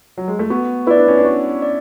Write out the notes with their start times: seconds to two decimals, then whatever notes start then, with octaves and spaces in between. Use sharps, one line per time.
0.18 F#3
0.28 G#3
0.39 A3
0.50 B3 F#4
0.87 E4 B4 D5
0.97 D4
1.08 C#4
1.18 D4
1.25 F#4
1.62 D5